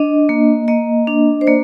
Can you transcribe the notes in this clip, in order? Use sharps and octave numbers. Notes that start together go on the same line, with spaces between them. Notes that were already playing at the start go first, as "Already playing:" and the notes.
Already playing: D4 D#5
A#3
A#3 D#5
D4
C5
A#3 D5